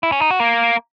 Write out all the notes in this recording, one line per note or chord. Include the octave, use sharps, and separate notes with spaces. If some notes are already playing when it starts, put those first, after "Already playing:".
E4
C#4
D#4
F#4
A#3